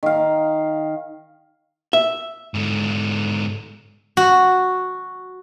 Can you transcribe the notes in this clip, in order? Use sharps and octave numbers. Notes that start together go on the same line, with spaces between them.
D#3 F5
E5
G#2 D3
F#4